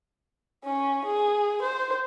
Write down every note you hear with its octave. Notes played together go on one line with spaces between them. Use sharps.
C#4
G#4
C5